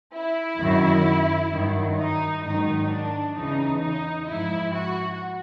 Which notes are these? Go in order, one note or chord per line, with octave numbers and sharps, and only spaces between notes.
E4
F#2 D#3 F#3
G2 D#3 F#3
D#4
G#2 D#3 F#3 D#4
D4
E2 C#3 E3 D#4
D#4
G#2 F3 E4
F#4